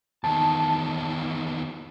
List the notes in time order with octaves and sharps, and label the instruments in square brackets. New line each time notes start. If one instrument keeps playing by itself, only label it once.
[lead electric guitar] E2 D#3 [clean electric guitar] A5